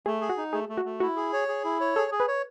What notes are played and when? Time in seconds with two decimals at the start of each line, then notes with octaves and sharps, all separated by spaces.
0.06 A3 G#4
0.21 G#4
0.29 F#4
0.37 D#4
0.53 A3 G#4
0.69 A3
0.77 F#4
0.85 A3
1.00 E4 F#4
1.16 G#4
1.33 C#5
1.48 G#4
1.64 E4
1.80 C#5
1.96 G#4 A4
2.12 G#4
2.20 B4
2.28 C#5